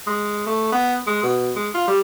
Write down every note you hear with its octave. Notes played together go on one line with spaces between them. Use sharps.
G#3
A3
B3
G#3
B2
G#3
F4
G3